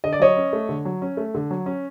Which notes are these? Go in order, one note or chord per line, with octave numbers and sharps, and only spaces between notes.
D3 D#5
D5
F#3 C#5 D#5
C#4
A3
D3
F#3
C#4
A3
D3
F#3
C#4